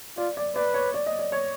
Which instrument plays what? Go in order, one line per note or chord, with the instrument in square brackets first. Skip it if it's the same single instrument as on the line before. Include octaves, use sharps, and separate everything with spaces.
[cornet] F4 [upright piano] D5
[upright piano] D5
[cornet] B4 [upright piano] D5
[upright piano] C#5
D5
D#5
D5
C#5